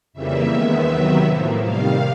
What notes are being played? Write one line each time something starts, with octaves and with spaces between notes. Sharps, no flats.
F2 C#3 E3 G3 A#3 E5
D#2 D#3 G#3 B3
C3 D#3 F#3 B3
A2 F3 A#3
C3 D#3 G3 F5